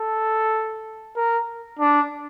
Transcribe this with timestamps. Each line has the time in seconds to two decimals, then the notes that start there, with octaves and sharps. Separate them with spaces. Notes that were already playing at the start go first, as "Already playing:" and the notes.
Already playing: A4
1.16 A#4
1.79 D4